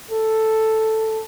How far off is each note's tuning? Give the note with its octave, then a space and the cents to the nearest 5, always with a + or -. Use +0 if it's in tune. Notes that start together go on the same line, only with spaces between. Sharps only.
A4 +0